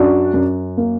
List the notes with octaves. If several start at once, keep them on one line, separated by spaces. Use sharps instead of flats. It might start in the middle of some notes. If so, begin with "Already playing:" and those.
Already playing: F#2 D4 F#4
F#2
A#3